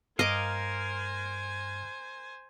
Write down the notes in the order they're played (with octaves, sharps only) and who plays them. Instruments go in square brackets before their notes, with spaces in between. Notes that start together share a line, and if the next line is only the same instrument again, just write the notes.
[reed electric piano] G2 [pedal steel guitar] A#4 F5 [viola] C5 G#5 [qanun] D#5 D6